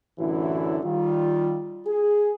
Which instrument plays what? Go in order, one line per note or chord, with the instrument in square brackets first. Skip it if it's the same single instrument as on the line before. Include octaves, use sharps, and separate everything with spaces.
[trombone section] A1 F#2 D3 E3 F#3 E4
D#3 G3 F4
G#4